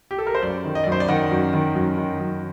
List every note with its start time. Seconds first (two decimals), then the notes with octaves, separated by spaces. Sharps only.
0.11 G4
0.18 A4
0.27 A#4
0.35 C5
0.42 F#2 D5
0.64 D#3
0.75 D#5
0.84 F#2 D5
0.92 C5
1.00 D5
1.08 D#3 F#5
1.31 F#2
1.53 D#3
1.75 F#2
1.97 D#3
2.20 F#2